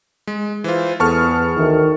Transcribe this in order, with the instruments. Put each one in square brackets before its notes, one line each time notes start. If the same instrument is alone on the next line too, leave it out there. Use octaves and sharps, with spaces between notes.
[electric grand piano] G#3
[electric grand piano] E3 F4 [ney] C5
[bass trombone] E2 [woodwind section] B3 A4 [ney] G#4 [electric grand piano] A5 C#6 F6
[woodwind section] D2 [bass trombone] D#3